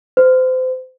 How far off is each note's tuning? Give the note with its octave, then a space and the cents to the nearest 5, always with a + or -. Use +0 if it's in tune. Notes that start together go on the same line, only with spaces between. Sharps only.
C5 -30